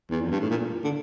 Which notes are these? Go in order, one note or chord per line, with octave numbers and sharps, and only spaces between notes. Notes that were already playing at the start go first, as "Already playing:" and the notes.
E2
F2
G2
A2
A#2
D3